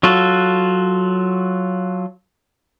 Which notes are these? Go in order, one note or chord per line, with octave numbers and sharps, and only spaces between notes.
F#3 F4 F#4 A4